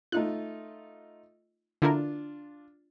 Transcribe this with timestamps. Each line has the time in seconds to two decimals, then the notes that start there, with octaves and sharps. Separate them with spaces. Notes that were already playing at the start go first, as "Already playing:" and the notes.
0.12 A3 D#4 F4 F#6
1.82 D3 D4 E4 F4 A#4